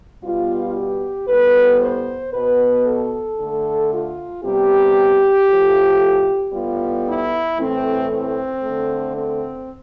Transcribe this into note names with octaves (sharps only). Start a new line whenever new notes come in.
B2 G3 B3 F4
G4
A2 G3 B3 B4
C5
B2 B3 B4
A4
D3 A3
F4
C3 G3 B3 G4
A2 F3 A3
A2 G3 B3 F4
E4
A2 E3 A3 C4
C4
D3 A3
C4